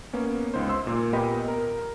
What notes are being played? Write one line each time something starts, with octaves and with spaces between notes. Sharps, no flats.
A#3 B3 C#4
C#2 D#4 C5
C6 E6
A#2 A#3
A#2 B3 G4 D#5 B5
A#4